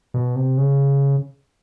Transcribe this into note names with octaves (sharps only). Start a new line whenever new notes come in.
B2
C3
C#3